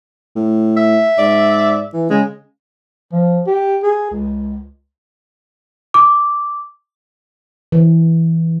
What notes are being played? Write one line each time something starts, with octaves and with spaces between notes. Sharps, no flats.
A2
E5
G#2 D5
E3
C#3 G#3
F3
G4
G#4
C#2
D6
E3